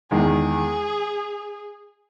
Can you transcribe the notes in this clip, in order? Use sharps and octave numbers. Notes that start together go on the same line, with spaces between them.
E2 D#3 G#3 G#4